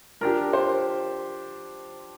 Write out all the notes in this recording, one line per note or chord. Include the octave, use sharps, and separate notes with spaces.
F3 D4 G4 A#4
C5